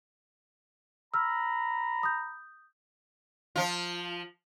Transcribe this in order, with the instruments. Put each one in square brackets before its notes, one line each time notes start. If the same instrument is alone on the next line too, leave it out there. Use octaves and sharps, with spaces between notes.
[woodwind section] A#5 B5 [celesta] E6 F6
[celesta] D#6 G6
[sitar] F3 F4